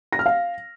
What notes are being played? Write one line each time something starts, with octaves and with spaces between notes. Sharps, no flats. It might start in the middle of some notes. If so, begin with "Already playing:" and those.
A#6
F6
F5